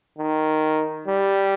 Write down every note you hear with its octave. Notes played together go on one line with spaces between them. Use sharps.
D#3
G3